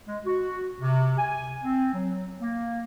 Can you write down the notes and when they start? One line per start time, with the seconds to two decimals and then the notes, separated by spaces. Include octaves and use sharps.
0.06 G#3
0.26 F#4
0.81 C3
1.18 G#5
1.64 C4
1.93 F#3
2.40 A#3